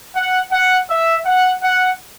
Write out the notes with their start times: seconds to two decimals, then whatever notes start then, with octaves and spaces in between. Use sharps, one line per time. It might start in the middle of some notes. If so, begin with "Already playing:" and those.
0.15 F#5
0.52 F#5
0.89 E5
1.25 F#5
1.63 F#5